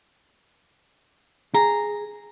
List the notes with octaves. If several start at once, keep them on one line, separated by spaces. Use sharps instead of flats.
G#4 A#5